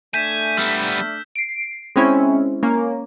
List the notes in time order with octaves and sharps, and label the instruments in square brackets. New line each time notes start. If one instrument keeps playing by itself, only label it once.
[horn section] A3 D4 [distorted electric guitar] G#5 [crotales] G6 B6 E7
[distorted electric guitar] G3 B3 [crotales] E6 F6 G6
[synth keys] C7 D7
G#3 C4 C#4 E4
A#3 C#4